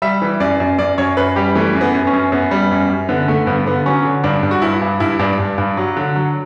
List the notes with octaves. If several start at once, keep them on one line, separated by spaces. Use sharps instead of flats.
G3 E5
E3
F#2 D5
F#2
F#2 D5
F#2 C#5
F#2 B4
G3 G4
E3 A3
F#2
B3
F#2
C#4
F#2
F#2 B3
G3
F#2
F#2
D3 B3
D3 A3
G2 B3
D3 B3
F#3 C#4
D3
G2 D4
G2
F#4
G2 E4
G2
G2 E4
G2 D4
G2
G2
F#3
D3
F#3